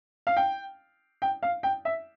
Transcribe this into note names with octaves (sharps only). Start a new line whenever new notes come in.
F5
G5
G5
F5
G5
E5